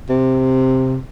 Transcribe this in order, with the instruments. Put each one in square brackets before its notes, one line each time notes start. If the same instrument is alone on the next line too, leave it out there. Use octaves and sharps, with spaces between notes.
[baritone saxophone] C3